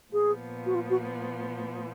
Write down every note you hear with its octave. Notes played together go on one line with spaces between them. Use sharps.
A#2 F3 B3 G#4
F#4
F4
F#4